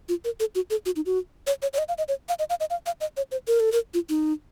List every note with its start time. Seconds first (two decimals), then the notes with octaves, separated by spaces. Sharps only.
0.09 F4
0.25 A#4
0.40 A4
0.55 F#4
0.70 A4
0.86 F#4
0.96 D#4
1.06 F#4
1.47 C#5
1.62 C#5
1.73 C#5
1.78 D#5
1.88 F5
1.98 D#5
2.08 C#5
2.29 F5
2.39 D#5
2.50 F5
2.60 D#5
2.70 F5
2.86 F5
3.01 D#5
3.17 C#5
3.32 C5
3.47 A#4
3.60 A4
3.72 A#4
3.94 F4
4.09 D#4